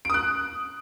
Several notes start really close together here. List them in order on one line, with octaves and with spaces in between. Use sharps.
D7 D#6 F#6